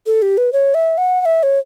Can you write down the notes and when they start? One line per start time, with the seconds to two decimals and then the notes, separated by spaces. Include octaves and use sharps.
0.07 A4
0.22 G4
0.38 B4
0.53 C#5
0.74 E5
0.98 F#5
1.21 F#5
1.25 E5
1.43 C#5